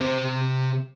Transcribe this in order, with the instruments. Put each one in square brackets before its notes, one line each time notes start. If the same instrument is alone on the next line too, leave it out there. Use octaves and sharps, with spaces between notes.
[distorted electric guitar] C3 C5